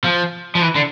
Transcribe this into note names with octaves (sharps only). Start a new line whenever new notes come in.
F3
F3
E3
D3